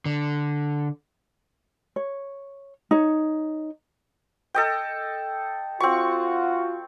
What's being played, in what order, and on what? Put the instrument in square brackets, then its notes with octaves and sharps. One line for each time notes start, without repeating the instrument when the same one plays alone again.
[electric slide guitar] D3
[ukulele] C#5
D#4 C#5
[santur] A4 D#5 G5
[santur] C4 C#6 [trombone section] F4 F#4